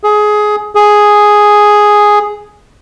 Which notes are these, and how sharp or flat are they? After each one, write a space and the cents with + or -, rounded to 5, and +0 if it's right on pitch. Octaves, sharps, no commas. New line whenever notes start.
G#4 +15
G#4 +0